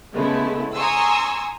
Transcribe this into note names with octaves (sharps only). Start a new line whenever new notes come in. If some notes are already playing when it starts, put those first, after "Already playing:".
C#3 G#3 A3 B3 E4
G#5 A#5 C6 C#6 D#6 E6